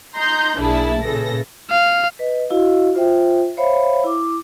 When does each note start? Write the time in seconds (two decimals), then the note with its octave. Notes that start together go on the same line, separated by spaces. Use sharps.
0.16 D#4 A#5 C6 G6
0.57 B1 A#3 D4 E4 G#4 A5
1.02 A#2 C#3 E3 A4 A#6
1.70 F5
2.19 B4 D#5
2.49 E4 F#4 D#5 F5
2.95 F4 C5 E5 G5
3.57 C5 C#5 E5 F5 B5
4.04 E4 D6